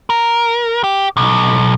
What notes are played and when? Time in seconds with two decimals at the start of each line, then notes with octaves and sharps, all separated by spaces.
0.10 A#4
0.84 G4
1.17 B1